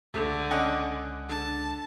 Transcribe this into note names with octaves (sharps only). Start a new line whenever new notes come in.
C#2 D3 A3
C#4 D#5 F#5
D3 A5